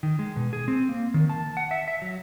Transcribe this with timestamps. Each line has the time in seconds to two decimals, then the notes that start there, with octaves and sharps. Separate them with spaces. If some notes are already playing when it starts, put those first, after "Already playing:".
0.03 D#3
0.19 G#3
0.36 B2
0.53 G#4
0.68 C4
0.89 A#3
1.14 D#3
1.30 A5
1.57 F#5
1.71 E5
1.88 E5
2.02 F#3